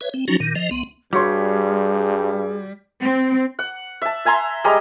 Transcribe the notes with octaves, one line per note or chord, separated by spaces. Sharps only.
B4 C#5 E5
C4
F3 F#3 C#4 D#4 F#4
A#2 D#3
F3 D#5
C2 B3
G2 G3 F#4 G#4 C#5 C6
C4
F#5
E5 A5
E5 G#5 A#5 C6
G3 G#3 D#5 A#5